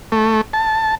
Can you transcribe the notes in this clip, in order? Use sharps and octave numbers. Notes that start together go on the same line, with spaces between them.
A3
A5